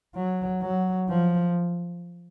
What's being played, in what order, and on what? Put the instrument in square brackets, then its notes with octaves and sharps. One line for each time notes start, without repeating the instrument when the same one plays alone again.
[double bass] F#3
F#3
F3